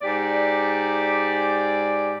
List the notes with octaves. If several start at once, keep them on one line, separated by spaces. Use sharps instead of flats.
G#2 G4 D5